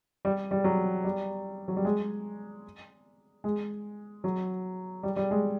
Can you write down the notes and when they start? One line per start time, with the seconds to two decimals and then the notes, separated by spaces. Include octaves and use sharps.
0.25 G3
0.51 G3
0.64 F#3
1.04 G3
1.68 F#3
1.76 G3
1.85 G#3
3.44 G#3
4.24 F#3
5.03 G3
5.16 G3
5.31 G#3